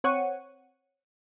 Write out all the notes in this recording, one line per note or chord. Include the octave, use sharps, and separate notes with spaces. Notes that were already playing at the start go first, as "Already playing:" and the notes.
C4 C#5 F#5 C#6 D#7